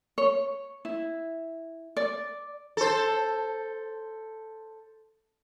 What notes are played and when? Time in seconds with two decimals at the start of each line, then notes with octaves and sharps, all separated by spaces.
0.18 C#5
0.85 E4
1.97 D5
2.77 A4 C5